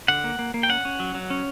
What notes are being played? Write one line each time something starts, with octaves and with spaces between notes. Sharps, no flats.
D3 F#5
A#3
A#3
A#3
G5
C#4 F#5
C#4
F#3
F#3
C#4